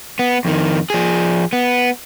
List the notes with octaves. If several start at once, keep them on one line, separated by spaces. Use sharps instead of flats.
B3
F2 D#3
F3 G#4
B3